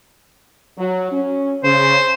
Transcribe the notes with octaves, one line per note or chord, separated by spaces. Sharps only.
F#3
C#4
C#3 C5